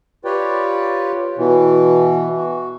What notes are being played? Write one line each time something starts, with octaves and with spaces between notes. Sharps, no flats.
F4 G4 B4 C#5 D5 G5
B2 E3
F#4